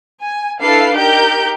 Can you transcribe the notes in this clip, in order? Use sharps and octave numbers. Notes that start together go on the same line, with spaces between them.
G#5
D4 E4 A4 B4 F5 C7
D#4 G4 A#4 G6 D7